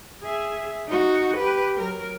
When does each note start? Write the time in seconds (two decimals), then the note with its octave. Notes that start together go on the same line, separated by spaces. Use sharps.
0.23 G#4 E5
0.88 D#4 F#4
1.37 G4 B4
1.76 F#3 A#4